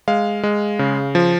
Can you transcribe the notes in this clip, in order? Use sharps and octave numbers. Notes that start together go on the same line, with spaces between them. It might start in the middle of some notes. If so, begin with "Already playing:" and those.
G#3 F5
G#3
C#3
F3